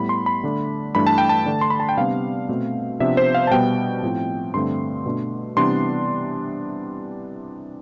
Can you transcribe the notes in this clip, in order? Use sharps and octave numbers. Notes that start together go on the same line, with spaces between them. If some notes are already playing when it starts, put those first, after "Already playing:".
Already playing: A2 G3 B3 B5
C6
B5
D3 A3 D4
G2 E3 A3 D4 B5
A5
G5
A5
D3 A3 D4
C6
B5
A5
G5
C3 G3 B3 D4 F5
B2 A3 C4
C3 F3 B3 D4 E5
C5
F5
A5
B2 G3 B3 G5
A2 F3 C4
G2 D3 A3 C4 C6
B2 A3 D4
C3 E3 G3 B3 D4 C6